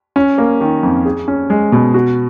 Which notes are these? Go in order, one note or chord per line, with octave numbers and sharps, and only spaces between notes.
C#4
A#3
D#3
F2
G#4
C#4
G#3
B2
F#4